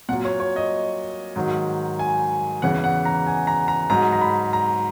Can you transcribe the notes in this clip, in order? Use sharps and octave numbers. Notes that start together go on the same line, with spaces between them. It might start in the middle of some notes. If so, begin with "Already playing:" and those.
A#2 F#3 F#5
C#5
C#5
D#5
G#2 D#3 F#3
G#5
E2 C#3 E3 F#5
F#5
A#5
G#5
A#5
A#5
G#2 F#3 A#5
A#5
B5
A#5